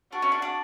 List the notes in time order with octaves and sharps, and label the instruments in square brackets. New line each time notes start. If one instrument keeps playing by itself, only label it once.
[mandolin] D4 [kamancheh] F#4
[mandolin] C#4
D4
D4